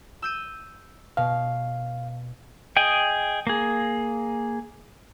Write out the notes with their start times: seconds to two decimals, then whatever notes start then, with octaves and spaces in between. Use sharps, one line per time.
0.22 E6 G6 D#7
1.17 B2 F5
2.77 G#4 D#5 G5
3.47 A#3 G#4